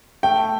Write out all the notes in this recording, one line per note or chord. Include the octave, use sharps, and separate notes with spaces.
A3 G5